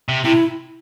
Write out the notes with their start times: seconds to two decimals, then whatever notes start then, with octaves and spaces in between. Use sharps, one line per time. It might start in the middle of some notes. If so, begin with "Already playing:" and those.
0.09 C3
0.25 C3 E4